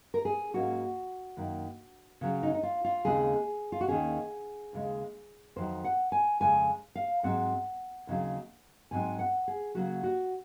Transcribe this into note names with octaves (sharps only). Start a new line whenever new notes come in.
A#4
G#4
G#2 F#3 A#3 C#4 F#4
F#2 D#3 A#3
C#3 F#3 C#4
D#4
D#4
F4
F4
D#2 C#3 G#3 C4 G#4
F4
F#4
D#2 D#3 A#3 C#4 G#4
D#2 C#3 G#3
F2 D#3 F#3 C5
F#5
G#5
F2 C#3 G#3 G#5
F5
G#2 F#3 C4 F#5
D#2 C#3 F#3 C4
G#2 D#3 F#3 C4 G#5
F#5
G#4
C#3 F#3 A#3 C#4 F#4
F#4